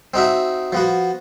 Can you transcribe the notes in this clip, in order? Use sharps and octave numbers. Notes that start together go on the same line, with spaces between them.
C4 D#4 F#4 E5
F3 B3 F#4